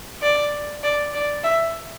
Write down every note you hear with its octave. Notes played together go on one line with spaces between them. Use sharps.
D5
D5
D5
E5